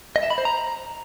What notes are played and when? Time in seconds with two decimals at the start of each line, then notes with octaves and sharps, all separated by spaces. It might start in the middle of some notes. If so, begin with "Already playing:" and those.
0.16 D#5
0.23 E5
0.30 B5
0.38 C5
0.45 A#5